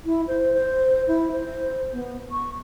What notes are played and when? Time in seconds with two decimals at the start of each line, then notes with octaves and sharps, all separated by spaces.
0.06 E4
0.28 C5
0.54 C5
1.07 E4
1.32 C5
1.93 B3
2.32 C#6